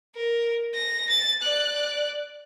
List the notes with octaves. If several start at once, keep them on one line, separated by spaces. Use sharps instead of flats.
A#4
A#6
A6
D5 F#6